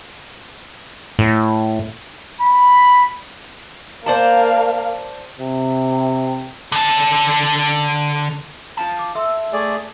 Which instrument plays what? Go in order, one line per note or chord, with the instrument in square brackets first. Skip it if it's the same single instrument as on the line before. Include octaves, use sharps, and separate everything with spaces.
[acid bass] A2
[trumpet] B5
[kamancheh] A#3 F5 [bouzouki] C5 D5 A5
[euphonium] C3
[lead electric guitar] D3 A5
[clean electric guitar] F4 F5 A5
[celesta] D6
[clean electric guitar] A4 [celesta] E5 C6 E6
[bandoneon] A3 G#4 D5